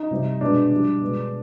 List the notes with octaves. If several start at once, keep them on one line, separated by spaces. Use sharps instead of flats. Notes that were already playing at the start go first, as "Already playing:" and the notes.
Already playing: D#4
C3 G3
B2 G#3 D4
D3 G3
B2 G#3